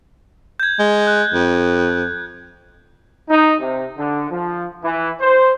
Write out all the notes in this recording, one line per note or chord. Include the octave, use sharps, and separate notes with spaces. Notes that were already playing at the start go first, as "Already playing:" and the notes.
G6 G#6
G#3
F#6
F2
D#4
C3
D3
F3
E3
C5